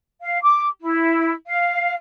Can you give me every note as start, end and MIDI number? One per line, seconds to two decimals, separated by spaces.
0.22 0.39 77
0.43 0.67 86
0.80 1.33 64
1.48 1.94 77